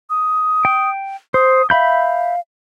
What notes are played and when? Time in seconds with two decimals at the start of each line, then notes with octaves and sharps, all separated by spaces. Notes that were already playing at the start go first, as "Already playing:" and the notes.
0.10 D#6
0.65 G5
1.34 C5 D#6
1.70 E5 F5 B5 G6